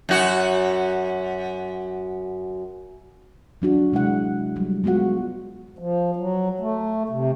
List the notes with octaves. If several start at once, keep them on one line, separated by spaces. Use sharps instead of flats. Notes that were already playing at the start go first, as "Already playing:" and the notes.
F#2 F#4
F#3 D4 F#4
C3 G#3 E4 F#5
F#3 G3
G#3 B3 F4 F#4 F#5
F3
F#3
A3
C3